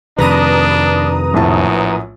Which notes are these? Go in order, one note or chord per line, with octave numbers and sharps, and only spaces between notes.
F2 C3 D#3 D4 B4 A#5 D#6
A#1 F#2 A2 A5